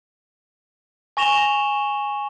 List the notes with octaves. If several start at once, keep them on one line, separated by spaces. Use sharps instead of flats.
G#5 C#6 A#6 E7 F7 G7